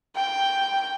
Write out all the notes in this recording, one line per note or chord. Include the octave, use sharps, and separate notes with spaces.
G5